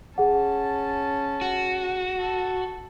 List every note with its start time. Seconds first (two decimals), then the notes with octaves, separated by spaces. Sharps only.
0.18 C#4 G#4 F#5 A5
1.41 F#4
2.20 A4